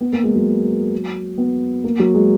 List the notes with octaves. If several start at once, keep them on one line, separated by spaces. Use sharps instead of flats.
B3
A#3
G#3
F#3
B3
A#3
F#3
G#3